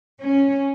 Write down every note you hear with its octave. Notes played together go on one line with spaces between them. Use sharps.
C#4